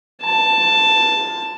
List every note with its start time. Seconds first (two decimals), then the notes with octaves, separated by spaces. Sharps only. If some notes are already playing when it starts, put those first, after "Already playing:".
0.22 A5